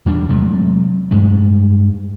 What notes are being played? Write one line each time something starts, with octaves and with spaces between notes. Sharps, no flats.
E2 G3 D4
C3 F#3 G#3 A3
G2 G#3 A3